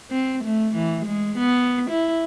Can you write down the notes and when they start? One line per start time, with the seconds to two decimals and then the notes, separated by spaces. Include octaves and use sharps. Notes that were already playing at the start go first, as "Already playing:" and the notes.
0.11 C4
0.44 A3
0.76 E3
1.06 G#3
1.38 B3
1.91 E4